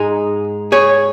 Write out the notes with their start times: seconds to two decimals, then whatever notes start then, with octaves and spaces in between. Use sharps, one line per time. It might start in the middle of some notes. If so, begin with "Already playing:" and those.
Already playing: G#2 G#3 D#4 G#4
0.72 G#4 C#5